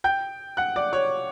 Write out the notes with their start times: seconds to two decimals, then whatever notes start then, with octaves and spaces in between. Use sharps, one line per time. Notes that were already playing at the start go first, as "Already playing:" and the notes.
0.04 G5 G6
0.57 F#5 F#6
0.76 D5 D6
0.93 C#5 C#6